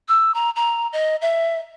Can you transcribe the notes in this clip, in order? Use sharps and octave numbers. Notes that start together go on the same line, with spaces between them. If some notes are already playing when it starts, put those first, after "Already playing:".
E6
A#5
A#5
D#5
E5